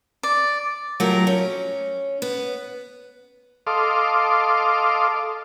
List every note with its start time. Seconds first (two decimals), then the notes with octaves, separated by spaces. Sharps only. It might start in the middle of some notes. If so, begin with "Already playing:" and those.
0.23 D5
1.00 F#3 A3 F4 G4 A#4
1.27 C#4
2.22 B3
3.67 A4 D#5 F5 C6 D6